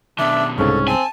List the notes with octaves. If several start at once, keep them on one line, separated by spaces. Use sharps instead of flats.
B2 D#3 D4 E5
C2 G#2 C#3 C#4 A4
C4 G#5 A5